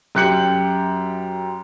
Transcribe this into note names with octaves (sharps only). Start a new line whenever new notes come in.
F#2 G4 F#6 G6 C#7 F#7